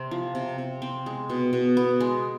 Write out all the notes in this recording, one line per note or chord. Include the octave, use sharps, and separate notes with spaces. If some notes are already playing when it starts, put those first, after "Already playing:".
Already playing: C3 C4
F3
C3
C3
C4
G#3
B2
B2
B3
G#3